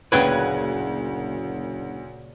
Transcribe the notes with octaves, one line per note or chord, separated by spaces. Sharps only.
F#1 D2 A#2 C#3 B4 G5 F#6 G#6